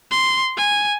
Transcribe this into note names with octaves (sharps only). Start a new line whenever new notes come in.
C6
G#5